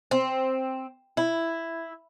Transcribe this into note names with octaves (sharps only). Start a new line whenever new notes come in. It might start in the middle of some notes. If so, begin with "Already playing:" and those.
C4
E4